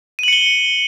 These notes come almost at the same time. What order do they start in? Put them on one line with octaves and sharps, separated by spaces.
D#7 F#7 C#7 G7